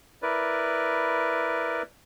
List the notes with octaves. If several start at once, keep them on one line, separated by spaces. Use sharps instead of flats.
E4 A#4 B4 D5